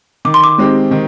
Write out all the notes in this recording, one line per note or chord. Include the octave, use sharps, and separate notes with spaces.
D#3 D6
C6
D6
G#3 C4 D#4 G4
D#3